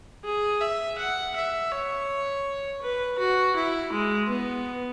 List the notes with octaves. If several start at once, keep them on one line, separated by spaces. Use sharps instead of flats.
G#4
E5
F#5
E5
C#5
B4
F#4
E4
G#3
B3